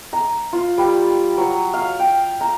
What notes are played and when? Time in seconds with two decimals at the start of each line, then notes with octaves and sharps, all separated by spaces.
0.13 A#5
0.53 F4
0.78 G3
1.37 F#3
1.73 F5
1.99 G5
2.41 A#5